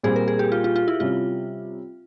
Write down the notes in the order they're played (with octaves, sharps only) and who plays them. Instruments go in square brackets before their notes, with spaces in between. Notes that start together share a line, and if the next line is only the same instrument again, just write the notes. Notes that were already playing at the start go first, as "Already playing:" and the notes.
[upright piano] A#2 G3 C4 [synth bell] G#4
[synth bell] A#4
G#4
G4
F4
F4
F4
E4
[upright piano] C3 G3 C#4 [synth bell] F4